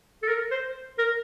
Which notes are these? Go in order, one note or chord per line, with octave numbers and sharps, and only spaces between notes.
A4
A#4
C5
A#4